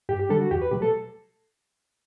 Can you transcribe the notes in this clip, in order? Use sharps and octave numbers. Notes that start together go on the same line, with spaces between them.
G2 G4
G4
D3 G3 D4 A4
F#4
E2 G4
B4
B2 F#3 A3 G4
A4